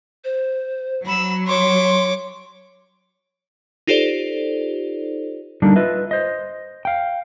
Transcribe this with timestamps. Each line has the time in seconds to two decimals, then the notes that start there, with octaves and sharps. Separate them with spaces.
0.24 C5
1.05 F#3 B5 E6
1.47 C#5 C6 D6
3.87 D#4 F4 G4 A4 C5 D5
5.62 D3 G3 A#3 D4 D#4
5.76 F4 B4 D#5 E5
6.11 C5 D#5
6.85 F5 G5